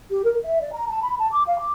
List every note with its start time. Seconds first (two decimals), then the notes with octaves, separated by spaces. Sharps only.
0.09 G4
0.24 A#4
0.42 E5
0.61 D5
0.73 A#5
0.87 A5
1.03 B5
1.18 A5
1.30 D6
1.47 F5
1.58 D6